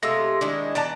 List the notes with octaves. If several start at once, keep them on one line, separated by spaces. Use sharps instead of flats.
C3 G#3 A3 F4 E6 A#6
D#3 G#3 D4 E4
E3 B3 D5 A5 A#5